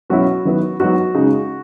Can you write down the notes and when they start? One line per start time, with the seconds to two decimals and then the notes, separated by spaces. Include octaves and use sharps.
0.10 B2 F#3 C#4 E4 F#4
0.45 D#3 F#3 B3 E4
0.80 F#3 B3 D#4 F#4
1.15 C#3 G#3 D#4